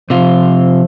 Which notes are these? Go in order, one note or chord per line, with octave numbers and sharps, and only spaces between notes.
C3 F3 F4